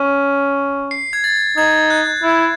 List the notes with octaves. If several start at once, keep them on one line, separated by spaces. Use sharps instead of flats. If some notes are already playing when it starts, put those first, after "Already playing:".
Already playing: C#4
C7
G#6
A6
D#4 G#6
F#6
E4